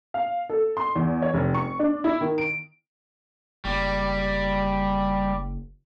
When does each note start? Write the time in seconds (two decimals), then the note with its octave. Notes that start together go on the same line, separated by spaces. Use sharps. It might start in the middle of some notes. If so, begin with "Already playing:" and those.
0.14 F5
0.50 A4
0.77 C6
0.96 E2
1.22 C#5
1.34 F1
1.55 C#6
1.79 D4
2.04 E4
2.21 D#3
2.38 D7
3.65 F#1 G3